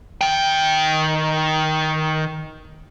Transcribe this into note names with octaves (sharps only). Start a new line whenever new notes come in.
D#3 G5